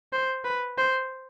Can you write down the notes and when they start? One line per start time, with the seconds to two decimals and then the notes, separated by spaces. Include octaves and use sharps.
0.13 C5
0.45 B4
0.78 C5